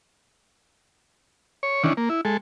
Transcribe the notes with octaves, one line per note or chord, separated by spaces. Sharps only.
C#5
D#3 E3 C#4 D4
A#3
E4
G#3 A4